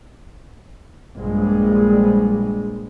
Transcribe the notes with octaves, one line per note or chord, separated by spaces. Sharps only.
A#1 G2 G#3